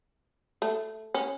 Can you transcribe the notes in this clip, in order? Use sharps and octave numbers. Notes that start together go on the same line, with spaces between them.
A3
C#4